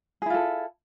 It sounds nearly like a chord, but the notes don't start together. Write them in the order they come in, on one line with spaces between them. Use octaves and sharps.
G#4 E4 F4 A4